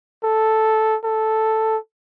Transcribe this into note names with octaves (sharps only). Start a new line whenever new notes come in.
A4
A4